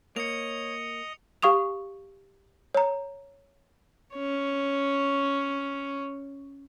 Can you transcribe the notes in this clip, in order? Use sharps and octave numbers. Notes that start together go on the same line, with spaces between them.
A#3 C#5 D#5 C#7 F7
G4 F5 C#6 D#6 F7
C#5 A#5
C#4 C#5